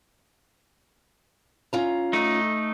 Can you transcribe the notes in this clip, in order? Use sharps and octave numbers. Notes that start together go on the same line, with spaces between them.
C#4 F4 A#5
A3 D#4